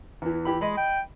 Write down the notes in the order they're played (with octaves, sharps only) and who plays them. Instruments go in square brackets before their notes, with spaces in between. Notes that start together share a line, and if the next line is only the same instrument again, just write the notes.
[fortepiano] E2 E3
E3 G4 B5
[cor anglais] G#3 [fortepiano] D#5 B5
[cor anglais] G5